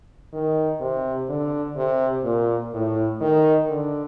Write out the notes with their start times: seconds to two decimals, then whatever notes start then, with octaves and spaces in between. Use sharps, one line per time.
0.33 D#3
0.80 C3
1.29 D3
1.76 C3
2.24 A#2
2.73 A2
3.21 D#3
3.69 D3